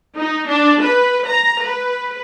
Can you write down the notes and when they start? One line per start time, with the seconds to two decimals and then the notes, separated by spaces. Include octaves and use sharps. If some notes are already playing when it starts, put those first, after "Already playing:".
0.17 D#4
0.49 D4
0.82 B4
1.27 A#5
1.64 B4